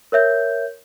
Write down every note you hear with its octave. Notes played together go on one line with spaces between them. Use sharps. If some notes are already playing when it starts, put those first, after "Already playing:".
A#4 C#5 E5 G6